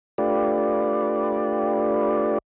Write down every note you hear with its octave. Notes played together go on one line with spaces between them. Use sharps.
A3 D4 F4 G4 B4 D5